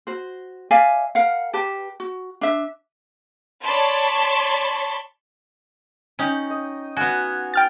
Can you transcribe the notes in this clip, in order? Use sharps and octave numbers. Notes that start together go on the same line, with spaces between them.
F#4 C5
D5 E5 F5 G#5
A#4 F5 F#5
G4 B4 A5
F#4
D4 E5
C#5 D5 A5 B5 C6
C#4 D#4 G5
D#5
B3 F#4 F5 G#5
G5 F6 A6